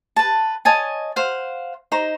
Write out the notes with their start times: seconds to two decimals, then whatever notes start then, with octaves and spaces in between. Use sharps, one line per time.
0.16 B4 A5
0.65 C#5 D#5 G#5 A5
1.16 C5 F5 F#5
1.92 D#4 C5 A#5